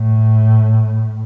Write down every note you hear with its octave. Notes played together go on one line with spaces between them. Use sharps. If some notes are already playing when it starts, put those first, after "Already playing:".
Already playing: A2